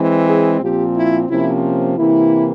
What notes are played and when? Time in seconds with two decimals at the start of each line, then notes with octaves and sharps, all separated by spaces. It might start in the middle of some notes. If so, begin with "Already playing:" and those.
Already playing: E3 G#3 C4
0.26 G#4
0.60 A#2 F3 C4 G4
0.94 E4
1.28 C3 F3 A#3 C#4 E4
1.96 C3 E3 A#3 E4